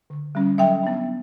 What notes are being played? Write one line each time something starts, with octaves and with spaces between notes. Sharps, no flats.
D3
G3 C#4
F#3 E5 G5
B3 D4